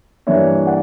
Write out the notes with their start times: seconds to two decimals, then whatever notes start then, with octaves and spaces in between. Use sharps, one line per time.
0.27 G2 E3 A#3 D4 C#5 E5
0.67 D5 F#5